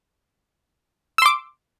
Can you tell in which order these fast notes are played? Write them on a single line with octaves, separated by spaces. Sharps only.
E6 C6 D6